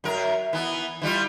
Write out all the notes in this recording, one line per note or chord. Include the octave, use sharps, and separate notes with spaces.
F#2 A#4
E3 B3
E3 G3 F4